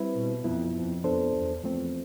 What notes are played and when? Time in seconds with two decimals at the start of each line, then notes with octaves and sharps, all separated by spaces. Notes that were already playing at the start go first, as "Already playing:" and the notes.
Already playing: G3 C4 E4 B4
0.14 B2
0.44 F2 F3 B3 E4
0.74 F2
1.04 F2 F3 B3 D4 A4 C5
1.33 E2
1.63 E2 F3 A3 C4